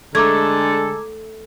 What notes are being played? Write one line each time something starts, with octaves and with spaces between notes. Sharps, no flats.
D3 G#3 A3 A4 A#5 D6 G#6